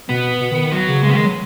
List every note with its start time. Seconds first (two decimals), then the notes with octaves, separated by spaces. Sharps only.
0.09 B2 B3
0.40 B2
0.51 D#3
0.62 D#3
0.72 F#3
0.88 C#3
1.03 C#3 G#3
1.09 B3
1.14 D#3 G#3
1.25 F#3